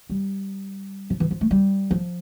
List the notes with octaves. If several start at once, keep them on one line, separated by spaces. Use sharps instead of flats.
G3
F3
E3
F3
A3
G3
F3